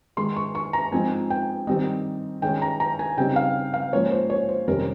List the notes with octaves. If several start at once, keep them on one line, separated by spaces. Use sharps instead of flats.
G#2 D#3 G#3 C6
C#6
C#6
A#5
G#2 F3 C4 D#4 G#5
G5
D#3 G3 C4 D#4 D#5
D#3 G#3 C#4 G5
A#5
A#5
G#5
C#3 G3 C4 D#4 G5
F5
F5
G#2 F3 A#3 C#4 C#5
C5
C#5
C5
F2 C3 D#3 G3 C#4 A#4